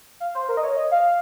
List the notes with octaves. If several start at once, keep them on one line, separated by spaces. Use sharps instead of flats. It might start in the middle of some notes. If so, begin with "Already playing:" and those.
F5
C5
A#4
D#5
C#5
D#5
F5